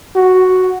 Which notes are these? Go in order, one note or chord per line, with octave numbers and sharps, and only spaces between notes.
F#4